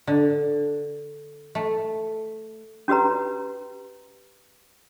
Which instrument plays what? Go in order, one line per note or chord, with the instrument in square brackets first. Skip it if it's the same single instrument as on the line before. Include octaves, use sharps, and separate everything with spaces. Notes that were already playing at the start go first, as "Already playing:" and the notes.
[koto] D3
A3
[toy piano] C#4 F#4 G4 B4 A#5